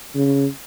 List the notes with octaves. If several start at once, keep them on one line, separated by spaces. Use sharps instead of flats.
C#3